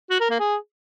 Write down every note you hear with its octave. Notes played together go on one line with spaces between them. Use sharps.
F#4
A#4
A#3
G#4